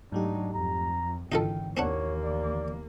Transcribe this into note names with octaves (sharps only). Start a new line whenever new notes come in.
G#2 F#3 A3 D4 D#4 G4
F2 A#5
G#1 D3 E3 D#4 F4 A4 G5
D#2 A#3 C4 D4 C#5 F#5
D5